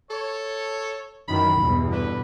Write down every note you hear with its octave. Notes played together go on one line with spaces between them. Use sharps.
A4 C#5
F#2 D#3 E3 B5
E2 G2 B2
D3 B4